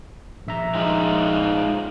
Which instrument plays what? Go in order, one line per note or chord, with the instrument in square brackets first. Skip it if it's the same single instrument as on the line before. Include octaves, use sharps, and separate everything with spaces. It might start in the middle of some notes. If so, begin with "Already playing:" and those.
[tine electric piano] A#1 E5 A#5
[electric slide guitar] G#3 D#4 F4